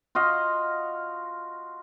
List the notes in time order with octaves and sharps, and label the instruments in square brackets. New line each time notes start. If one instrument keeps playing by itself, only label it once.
[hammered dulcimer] F4 F#4 D#5 F5